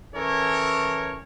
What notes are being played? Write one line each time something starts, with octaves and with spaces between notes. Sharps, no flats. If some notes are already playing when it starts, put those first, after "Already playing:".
E3 C#4 A4 A#4 C#5